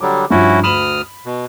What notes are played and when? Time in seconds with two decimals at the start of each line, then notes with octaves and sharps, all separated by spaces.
0.01 D3 F#3 G3 D6
0.30 G2 F3 C#4 E4 F#4
0.63 D2 B5 D#6 F6 E7 F#7
1.26 B2